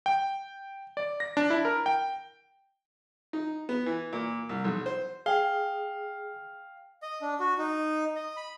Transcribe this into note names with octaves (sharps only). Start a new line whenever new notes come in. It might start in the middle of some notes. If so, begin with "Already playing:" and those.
G5
D5
A#6
D4
E4
A#4
G5
D#4
B3
E3
A#2
C2
B1
C5
G#4 F5 G5 G7
D#5
D4
F#4
D#4
D#5
B5